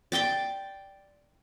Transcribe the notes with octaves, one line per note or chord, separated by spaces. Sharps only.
D5 G5 C6 D6